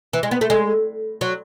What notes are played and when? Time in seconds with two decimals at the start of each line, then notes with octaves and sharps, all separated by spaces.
0.13 E3
0.23 G#3
0.31 B3
0.41 A3
0.50 G#3
1.21 F#3